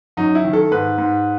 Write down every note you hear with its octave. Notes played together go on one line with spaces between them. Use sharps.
F#2 D#4
E4
D#3
A4
G#2 B4
G#2